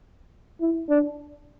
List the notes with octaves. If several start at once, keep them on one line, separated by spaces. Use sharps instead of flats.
E4
D4